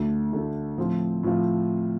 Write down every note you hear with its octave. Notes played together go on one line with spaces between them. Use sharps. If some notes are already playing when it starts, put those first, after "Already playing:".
Already playing: D2 D3 A3
D2 D3 A3
A2 F3 C4 F4
A2 F3 C4 F4